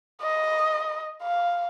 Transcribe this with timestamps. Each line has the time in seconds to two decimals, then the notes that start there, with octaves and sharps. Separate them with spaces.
0.22 D#5
1.22 F5